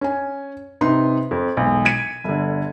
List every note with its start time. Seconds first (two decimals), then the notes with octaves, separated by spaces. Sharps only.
0.01 C#4 G#5
0.81 C3 D#4 B4 C6
1.31 F2
1.57 E1 B1
1.85 G#6 B6 C#7 D#7
2.24 G1 D3